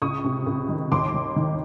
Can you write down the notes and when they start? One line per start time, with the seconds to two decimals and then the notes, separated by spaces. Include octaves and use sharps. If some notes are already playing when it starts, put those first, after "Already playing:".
0.02 C#2 C#6 D#6
0.24 C3
0.46 C#2
0.69 D#3
0.92 D#2 C6 D6
1.14 D#3
1.36 D#3